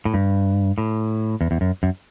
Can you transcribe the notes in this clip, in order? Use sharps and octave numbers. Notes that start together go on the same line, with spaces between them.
A2
G2
A2
E2
E2
F#2
F#2